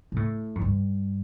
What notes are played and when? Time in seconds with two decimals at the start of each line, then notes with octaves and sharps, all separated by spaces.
0.12 B2
0.16 A2
0.55 F#2
0.61 G2